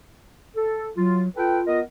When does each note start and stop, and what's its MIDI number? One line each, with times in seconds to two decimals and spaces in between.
0.56 0.89 69
0.96 1.28 54
0.96 1.22 65
1.37 1.79 65
1.37 1.61 69
1.37 1.61 71
1.37 1.61 79
1.67 1.81 59
1.67 1.81 70
1.67 1.81 75